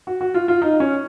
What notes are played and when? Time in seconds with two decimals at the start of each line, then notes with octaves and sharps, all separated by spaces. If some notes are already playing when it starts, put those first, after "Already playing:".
0.07 F#4
0.21 F#4
0.34 F4
0.48 F4
0.62 D#4
0.80 C#4